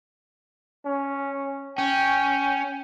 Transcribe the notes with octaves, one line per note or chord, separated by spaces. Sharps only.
C#4
C#4 G5